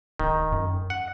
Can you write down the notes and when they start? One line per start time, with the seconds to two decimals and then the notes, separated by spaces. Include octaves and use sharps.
0.19 D1 D#3
0.52 F#2
0.90 F#5